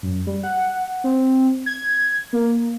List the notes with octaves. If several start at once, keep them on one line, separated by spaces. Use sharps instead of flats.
F#2
G3
F#5
C4
G#6
A#3